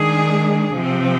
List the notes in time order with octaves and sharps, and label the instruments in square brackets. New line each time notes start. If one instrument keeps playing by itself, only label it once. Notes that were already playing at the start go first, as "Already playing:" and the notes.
Already playing: [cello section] D#3 G#3 D4 G#4
C3 F3 C4